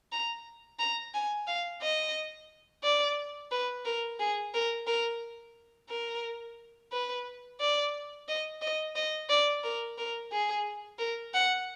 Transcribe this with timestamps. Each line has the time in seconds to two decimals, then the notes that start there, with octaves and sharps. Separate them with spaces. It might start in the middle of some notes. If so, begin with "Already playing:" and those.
0.12 A#5
0.79 A#5
1.14 G#5
1.48 F5
1.82 D#5
2.84 D5
3.51 B4
3.85 A#4
4.20 G#4
4.54 A#4
4.87 A#4
5.89 A#4
6.92 B4
7.60 D5
8.28 D#5
8.62 D#5
8.96 D#5
9.30 D5
9.64 A#4
9.98 A#4
10.32 G#4
10.99 A#4
11.34 F#5